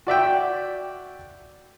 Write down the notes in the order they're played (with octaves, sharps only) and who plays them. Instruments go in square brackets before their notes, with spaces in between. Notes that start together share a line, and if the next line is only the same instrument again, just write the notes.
[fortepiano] F#4 D5 E5 G5